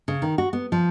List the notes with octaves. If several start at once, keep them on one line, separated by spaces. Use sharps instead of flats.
C#3
D#3
F#4
B3
F3